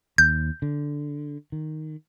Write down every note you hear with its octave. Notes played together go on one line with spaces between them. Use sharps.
D#2 G6
D3
D#3